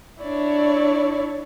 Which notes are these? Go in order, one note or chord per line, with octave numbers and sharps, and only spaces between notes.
D4 E4 C#5 D5